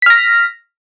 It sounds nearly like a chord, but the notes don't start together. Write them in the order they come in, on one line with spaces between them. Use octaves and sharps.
B6 F6 A#6